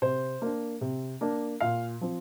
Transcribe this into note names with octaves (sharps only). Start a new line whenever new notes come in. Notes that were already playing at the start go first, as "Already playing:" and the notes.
C3 C5
A#3 D4
C3
A#3 D4
A#2 F5
F3 C4